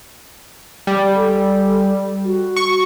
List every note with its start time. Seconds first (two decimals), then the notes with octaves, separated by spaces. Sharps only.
0.87 G3
1.15 A4
2.25 F#4
2.56 C#6